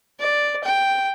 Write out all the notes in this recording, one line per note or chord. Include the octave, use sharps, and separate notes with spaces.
D5
G5